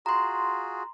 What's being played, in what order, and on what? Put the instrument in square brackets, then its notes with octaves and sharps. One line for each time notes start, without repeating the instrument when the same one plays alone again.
[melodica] F4 F#4 G#4 [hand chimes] A#5 C6